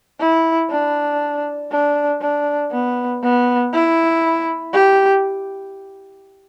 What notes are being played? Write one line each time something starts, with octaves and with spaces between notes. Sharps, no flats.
E4
D4
D4
D4
B3
B3
E4
G4